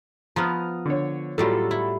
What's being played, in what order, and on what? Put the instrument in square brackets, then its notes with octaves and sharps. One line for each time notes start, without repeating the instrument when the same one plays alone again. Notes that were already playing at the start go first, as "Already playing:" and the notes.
[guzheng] F3 B3 [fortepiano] A#5 D#6 F6
[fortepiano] D3 C#5
[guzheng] A2 F#3 G3 [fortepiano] F4 F#4 A4
[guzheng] E4